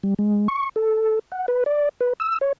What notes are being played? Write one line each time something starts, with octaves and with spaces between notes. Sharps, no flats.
G3
G#3
C#6
A4
F#5
B4
D5
B4
E6
C#5